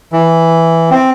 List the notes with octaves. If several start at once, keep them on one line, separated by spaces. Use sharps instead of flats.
E3
C4